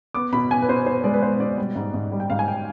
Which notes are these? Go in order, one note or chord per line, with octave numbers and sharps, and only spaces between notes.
B3 D6
B2 B5
B3 G#5
B4
B2 C5
B3 C5
G#3 D5
B4
B3 C5
B2 D5
G3
G#2
G#2
G3
G5
G#2 F5
G#5
G5